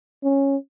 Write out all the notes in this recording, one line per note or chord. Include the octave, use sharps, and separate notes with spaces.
C#4